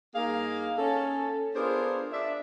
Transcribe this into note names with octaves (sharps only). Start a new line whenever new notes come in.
G2 A#3 D#4 G#4 F5
C#4 A4
B3 D4 F4 G#4 A#4 C5
D4 E5